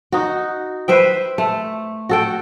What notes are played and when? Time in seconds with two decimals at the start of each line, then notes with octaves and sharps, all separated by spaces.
0.12 D#4 F#4
0.88 B4 C5 E5 G5
1.38 A3
2.09 F#4 A4 G5